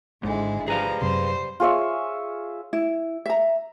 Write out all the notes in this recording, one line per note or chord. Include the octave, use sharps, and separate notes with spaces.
G#1 G#2 D3 G#3 E4
F3 G3 G#4 B4 F5 A#5
F#2 C3 C5 C6
F4 G#4 C#5 E5
E4
E5 A#5